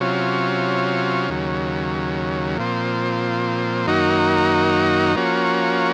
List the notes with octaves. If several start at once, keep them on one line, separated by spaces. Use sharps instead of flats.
C3 F#3 C#4 F4
D#2 C#3 F#3
A#2 F3 C4
F#2 D#3 A#3 D#4 F#4
F3 A#3 C#4 F#4